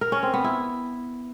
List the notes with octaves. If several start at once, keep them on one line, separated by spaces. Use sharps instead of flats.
A#4
C#4
C4
B3
E4